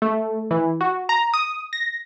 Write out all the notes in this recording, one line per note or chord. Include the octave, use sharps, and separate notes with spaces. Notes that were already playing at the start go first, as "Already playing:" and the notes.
A3
E3
F#4
A#5
D#6
A#6